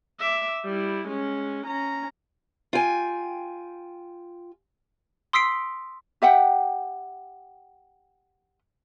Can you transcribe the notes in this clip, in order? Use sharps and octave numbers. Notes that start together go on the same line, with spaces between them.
E5 D6
G3 E4
G#3 C#4
C#4 A#5
F4 G5 G#5
C6 D#6 E6 B6 C7 D7
G4 E5 F#5 G5